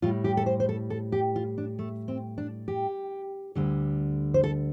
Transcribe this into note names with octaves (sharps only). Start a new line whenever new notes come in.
A2 G3 F4
G4
A4
C5
C5
A4
A4
G4
F4
D4
A3
C4
D4
G4
D2 D3 G3
C5
A4